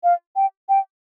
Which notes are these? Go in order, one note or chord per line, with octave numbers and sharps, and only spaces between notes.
F5
G5
G5